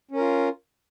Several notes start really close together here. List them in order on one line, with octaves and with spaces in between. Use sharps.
C#4 A#4 F4